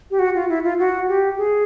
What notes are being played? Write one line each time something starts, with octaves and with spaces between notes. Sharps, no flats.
G4
F#4
F4
E4
F4
F#4
G4
G#4